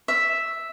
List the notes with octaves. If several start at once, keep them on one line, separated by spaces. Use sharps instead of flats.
E5